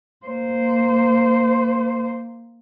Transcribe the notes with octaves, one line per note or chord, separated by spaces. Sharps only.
A#3 C5